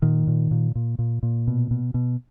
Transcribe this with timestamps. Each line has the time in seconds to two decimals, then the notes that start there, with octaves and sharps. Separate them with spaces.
0.02 A#2 D#3
0.27 A#2
0.51 A#2
0.75 A#2
0.99 A#2
1.23 A#2
1.47 B2
1.71 B2
1.94 B2